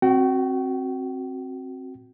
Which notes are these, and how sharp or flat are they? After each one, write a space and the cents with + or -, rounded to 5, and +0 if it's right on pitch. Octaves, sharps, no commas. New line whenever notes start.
C4 +15 F#4 +0 G5 -35